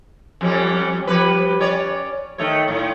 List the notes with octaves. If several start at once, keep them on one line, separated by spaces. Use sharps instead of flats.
F2 G3 C#4
F3 G3 B4
C#4 C#5 D5
D#3 A3 C#5
A2